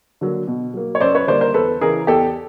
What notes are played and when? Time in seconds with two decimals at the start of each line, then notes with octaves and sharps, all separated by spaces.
0.21 D3 F#3 A#3
0.47 B2
0.74 F#3 A#3
0.95 C#5
1.01 F#2 C5 D5
1.15 B4 C#5
1.27 D3 G3 A#3 C5 D5
1.40 A#4 C5
1.54 E2 A4 B4
1.81 C#3 E3 G#4 A#4
2.07 E2 G4 A4